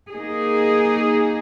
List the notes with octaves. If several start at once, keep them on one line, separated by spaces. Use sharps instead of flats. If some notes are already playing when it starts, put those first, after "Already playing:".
A#3 D#4 G#4